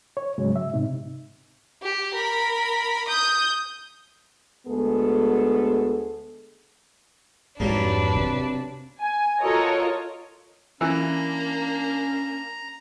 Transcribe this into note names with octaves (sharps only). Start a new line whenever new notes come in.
C#5
G#2 C#3 F#3 G#3
E5
G#2 C3 D#4
G4
A#4 B5
D#6 G6
D2 G#3 B3 G#4 A4
F2 G#2 F#3 G3 A#3 D4 B4
C3 C4
G#5
F4 F#4 A4 A#4 C#5 D#5
E3 A#3 C#4 D4 A#5